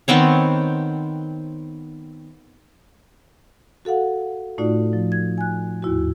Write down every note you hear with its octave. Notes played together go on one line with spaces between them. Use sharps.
D#3 B3 C4 C#5
F#4 A4 F5 F#5
A2 A3 D#4 F4 F#4 D5
F3
G#6
G#5 F#6
D#2 G#2 E4 F#4